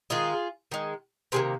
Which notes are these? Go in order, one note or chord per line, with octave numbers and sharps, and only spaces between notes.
D#3 G#3 F4 G#4
D#3 G#3
C3 D#3 A#3 G#4 C5